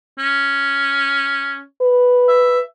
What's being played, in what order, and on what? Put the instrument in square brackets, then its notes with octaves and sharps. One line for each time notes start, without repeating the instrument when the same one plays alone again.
[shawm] C#4
[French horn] B4
[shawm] E5